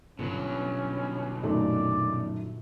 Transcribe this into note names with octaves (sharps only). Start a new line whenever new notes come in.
G1 B2 F#3 C#4
F#2 A#2 D#3 A3 D5